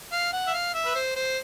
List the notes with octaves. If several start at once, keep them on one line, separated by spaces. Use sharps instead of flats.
F5
F#5
E5
F5
E5
B4
C5
C5